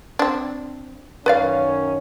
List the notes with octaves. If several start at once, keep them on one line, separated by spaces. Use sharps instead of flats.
C4 D4
F#2 D#3 C#4 B4 D5 F5